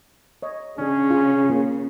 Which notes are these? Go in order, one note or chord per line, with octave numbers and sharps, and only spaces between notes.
C#5 D#5
C#3 C#4 D4 G#4
F4 G#4
A#3 F4